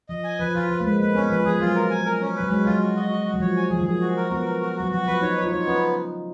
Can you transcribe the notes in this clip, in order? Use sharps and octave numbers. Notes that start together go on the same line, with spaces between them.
F3 D#5
G#5
F3 B4
F3 F4
F3 B4
A#3
G#3 B4
A#3 B4
B3 C#4
F3 B4
F3 G#4
F#3 F4
A#4
G#5
A#4
C#4
F#3 B4
G#3 C#4
F#3 F4
F#4
D#5
F#4
F#4
F#3
F3 C#5
G#5
F3 G#4
D#3
F3 G#4
F#4
A#4
B3 F#4
A#4
F#4
F#3 F#4
F3 F#4
F3 B4
D#4 C#5
C#5
F4
D#4 C#5
B3 C#4